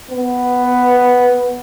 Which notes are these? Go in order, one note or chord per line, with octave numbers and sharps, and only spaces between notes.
B3